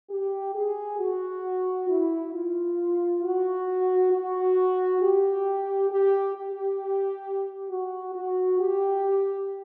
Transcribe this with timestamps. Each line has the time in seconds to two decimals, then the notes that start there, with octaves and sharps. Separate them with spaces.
0.10 G4
0.55 G#4
0.99 F#4
1.89 E4
2.34 F4
3.23 F#4
4.12 F#4
5.02 G4
5.91 G4
6.35 G4
7.69 F#4
8.15 F#4
8.59 G4